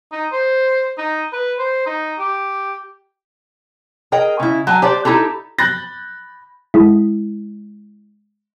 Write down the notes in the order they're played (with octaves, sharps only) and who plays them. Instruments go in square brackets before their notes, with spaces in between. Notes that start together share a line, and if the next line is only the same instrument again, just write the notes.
[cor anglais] D#4
C5
D#4
B4
C5
D#4
G4
[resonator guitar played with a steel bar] G#4 A#4 D#5 G5
C#3 E4
F#3 G#5 A5
G4 C5 D5
D#4 E4 G4 A4
[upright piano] B5 F#6 G6 A6 A#6
[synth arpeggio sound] G#3 E4